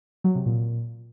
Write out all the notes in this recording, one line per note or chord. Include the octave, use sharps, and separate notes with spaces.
F#3
C3
A#2